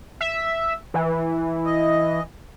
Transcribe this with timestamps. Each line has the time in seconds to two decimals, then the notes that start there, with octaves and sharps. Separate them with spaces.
0.21 E5
0.94 E3
1.65 D#5